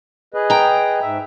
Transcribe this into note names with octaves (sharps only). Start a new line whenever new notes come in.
G#4 B4 D#5
G5 A#5
G#2 E5